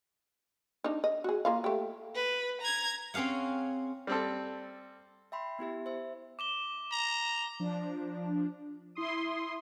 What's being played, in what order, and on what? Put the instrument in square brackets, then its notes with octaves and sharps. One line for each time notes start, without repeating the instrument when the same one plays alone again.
[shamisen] D4 D#4
D#5
F#4 G#4
A#3 F4 F5
A3 G4
[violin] B4
A#5 G#6
[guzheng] C4 C#4 G#4 F5 F#5
[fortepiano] G3 C4 A4
[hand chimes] E5 G5 B5 C6
B3 E4 G4 E5
C5 E5
[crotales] D6 E7 G7
[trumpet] A#5
[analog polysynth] F3 D4
E4 C6 D#6